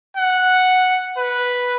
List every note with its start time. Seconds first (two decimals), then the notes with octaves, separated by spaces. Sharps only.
0.17 F#5
1.18 B4